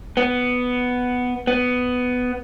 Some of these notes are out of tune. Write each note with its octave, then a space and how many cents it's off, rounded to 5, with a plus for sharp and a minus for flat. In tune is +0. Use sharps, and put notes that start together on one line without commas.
B3 +5
B3 +10